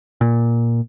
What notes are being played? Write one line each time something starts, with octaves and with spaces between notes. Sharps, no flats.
A#2